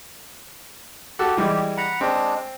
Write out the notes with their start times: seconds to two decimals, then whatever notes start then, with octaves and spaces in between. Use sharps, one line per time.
1.19 F#4 G4 A4
1.37 E3 G3 G#3
1.77 F#5 A#5 B5
2.01 G#3 C4 D4